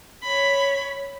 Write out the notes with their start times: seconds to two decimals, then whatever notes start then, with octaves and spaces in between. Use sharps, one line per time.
0.23 C#5 B5